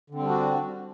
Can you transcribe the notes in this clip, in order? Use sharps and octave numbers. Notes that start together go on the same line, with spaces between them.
D3 G3 C4 D4 F#4